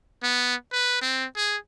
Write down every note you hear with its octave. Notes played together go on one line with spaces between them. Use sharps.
B3
B4
C4
G#4